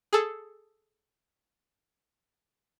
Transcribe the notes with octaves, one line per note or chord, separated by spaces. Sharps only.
G#4 A4